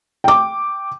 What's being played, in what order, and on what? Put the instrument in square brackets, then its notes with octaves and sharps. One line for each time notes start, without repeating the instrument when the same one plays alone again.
[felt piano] G5 D6